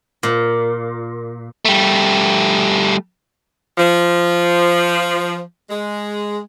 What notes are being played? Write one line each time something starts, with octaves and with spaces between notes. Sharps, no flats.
A#2
G3 A3
F3
G#3